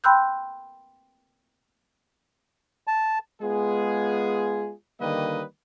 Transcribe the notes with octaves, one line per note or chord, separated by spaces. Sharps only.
G5 B5 C6 E6 F#6 G6
A5
G#3 B3 F4 G#4
D3 D#3 G3 A#3 B4 D#5